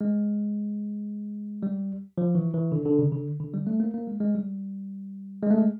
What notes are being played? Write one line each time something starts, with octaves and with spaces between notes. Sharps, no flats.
G#3
G3
F3
E3
E3
D3
D3
C#3
D3
D3
G3
A3
A#3
A#3
G#3
G#3
G3
G#3
A3
G#3